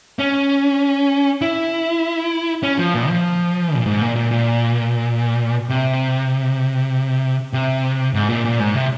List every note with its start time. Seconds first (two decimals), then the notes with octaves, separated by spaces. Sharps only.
0.19 C#4
1.41 E4
2.63 C#4
2.79 F3
2.94 A#2
3.09 F3
3.75 A#2
3.86 G#2
4.01 A#2
4.16 A#2
4.31 A#2
5.69 C3
7.53 C3
8.14 G#2
8.29 A#2
8.45 A#2
8.60 G#2
8.75 C3